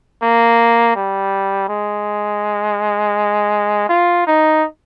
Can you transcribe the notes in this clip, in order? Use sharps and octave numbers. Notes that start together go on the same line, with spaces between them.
A#3
G3
G#3
F4
D#4